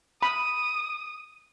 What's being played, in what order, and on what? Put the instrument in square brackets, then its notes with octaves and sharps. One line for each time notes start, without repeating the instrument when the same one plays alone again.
[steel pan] B5 [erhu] D#6